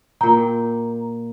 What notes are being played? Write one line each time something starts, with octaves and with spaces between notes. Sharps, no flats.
A#2 G5 A#5